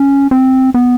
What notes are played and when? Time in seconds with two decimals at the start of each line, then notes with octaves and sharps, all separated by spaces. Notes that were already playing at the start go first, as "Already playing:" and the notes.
Already playing: C#4
0.31 C4
0.74 B3